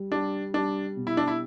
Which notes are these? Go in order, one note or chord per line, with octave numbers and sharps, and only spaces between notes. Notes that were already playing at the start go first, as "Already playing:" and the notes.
Already playing: G3
G3 D4
G3 D4
B2
E4
D4
E4